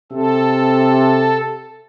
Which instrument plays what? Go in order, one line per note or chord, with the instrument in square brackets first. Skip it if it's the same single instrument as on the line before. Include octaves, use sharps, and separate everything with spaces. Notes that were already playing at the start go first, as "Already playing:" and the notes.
[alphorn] C3 [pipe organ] A4